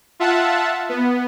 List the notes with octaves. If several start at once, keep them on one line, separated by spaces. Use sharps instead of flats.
F4 E5 F#5 A5
B3